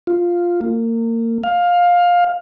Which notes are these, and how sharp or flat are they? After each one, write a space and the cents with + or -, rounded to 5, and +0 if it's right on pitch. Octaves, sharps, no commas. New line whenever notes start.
F4 +0
A#3 -30
F5 +15